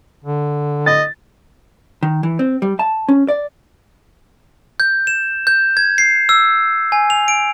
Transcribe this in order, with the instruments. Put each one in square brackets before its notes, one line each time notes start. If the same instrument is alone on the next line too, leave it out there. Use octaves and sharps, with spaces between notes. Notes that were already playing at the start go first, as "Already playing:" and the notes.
[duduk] D3
[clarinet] D#5 [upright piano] A6
[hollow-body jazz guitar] D#3
E3
C4
G3
A5
C#4
D5
[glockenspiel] G6
E7
G6
G#6
C7
E6
G#5
F7
D7